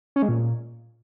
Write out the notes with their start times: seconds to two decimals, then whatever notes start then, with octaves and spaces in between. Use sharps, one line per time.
0.16 C#4
0.22 G#3
0.29 A#2